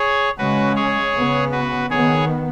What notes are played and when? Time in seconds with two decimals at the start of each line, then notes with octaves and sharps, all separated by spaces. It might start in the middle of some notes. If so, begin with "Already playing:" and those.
Already playing: G#4 C#5
0.38 C#3 G#3 C#4 F#4 B4
0.75 G#4 C#5
1.13 C#3 B3
1.51 F#4 B4
1.90 D#3 B3 G#4 C#5